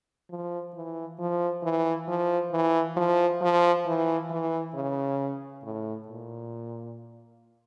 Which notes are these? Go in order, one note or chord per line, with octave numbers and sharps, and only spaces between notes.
F3
E3
F3
E3
F3
E3
F3
F3
E3
E3
C#3
A2
A#2